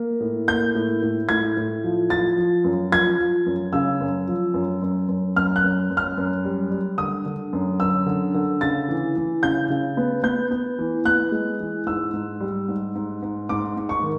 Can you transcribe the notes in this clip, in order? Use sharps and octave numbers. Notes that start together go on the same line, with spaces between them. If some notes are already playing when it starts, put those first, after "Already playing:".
Already playing: A#3
A2
A#3 G6
A2
A2
A2 G#6
A2
F3
F3 A6
F3
F#2
F3 G#6
F3
F#2
C#3 E6
F#2
F3
F#2
F#2
F#2
F#2 F6
F#6
F#2
F#2
F6
F#2
G3
G3
D3 D#6
D3
F#2
F#2 E6
D3
D3
C#3 A6
E3
E3
C#3 G6
C#3
B3
B3 G6
B3
E3
B3 F#6
G#3
E3
G#2 E6
G#2
G3
G#2
G#2
G#2
G#2 D6
G#2
C#6
D#3